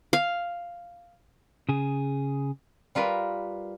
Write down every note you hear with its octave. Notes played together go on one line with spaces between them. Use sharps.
F5
C#3 G#4
G3 F4 A#4 B4